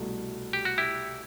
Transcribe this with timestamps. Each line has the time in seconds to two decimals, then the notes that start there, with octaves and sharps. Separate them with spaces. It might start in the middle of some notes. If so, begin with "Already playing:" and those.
Already playing: C2 B2 A3
0.53 G4
0.65 F#4
0.78 E4 G4